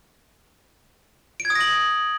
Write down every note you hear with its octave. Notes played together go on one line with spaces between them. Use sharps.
D7
G#6
D#6
A#6
F#7